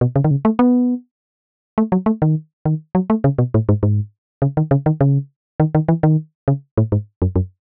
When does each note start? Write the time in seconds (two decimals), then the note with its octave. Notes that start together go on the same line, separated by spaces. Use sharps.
0.01 B2
0.16 C#3
0.24 D#3
0.31 C#3
0.45 A3
0.59 B3
1.78 A3
1.92 F#3
2.06 A3
2.22 D#3
2.66 D#3
2.95 F#3
3.10 A3
3.24 C#3
3.38 B2
3.54 A2
3.69 G#2
3.83 G#2
4.42 C#3
4.57 D#3
4.71 C#3
4.86 D#3
5.01 C#3
5.60 D#3
5.75 D#3
5.88 E3
6.03 D#3
6.48 C#3
6.78 A2
6.92 G#2
7.22 F#2
7.36 F#2